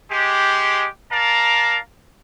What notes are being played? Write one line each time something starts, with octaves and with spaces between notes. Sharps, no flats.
G#3 G4
A#4 D5 F5 A5 A#5